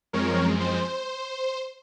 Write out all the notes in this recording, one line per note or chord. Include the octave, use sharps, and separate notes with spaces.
F#2 F3 G#3 C4 A#4 C#5
C5